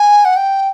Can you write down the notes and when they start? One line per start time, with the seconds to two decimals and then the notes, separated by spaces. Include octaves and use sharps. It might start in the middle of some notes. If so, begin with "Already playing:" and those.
Already playing: G#5
0.25 F#5
0.37 G5